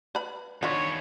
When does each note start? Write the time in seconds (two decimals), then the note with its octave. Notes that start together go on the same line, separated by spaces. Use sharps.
0.15 B4 B5
0.63 D#2 D3 B3 F4 C#5